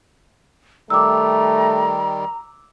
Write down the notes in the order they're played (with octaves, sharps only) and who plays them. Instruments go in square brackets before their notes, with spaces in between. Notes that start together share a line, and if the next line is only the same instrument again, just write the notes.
[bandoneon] D#3 G3 [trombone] A3 [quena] A#5 [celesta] D6 E6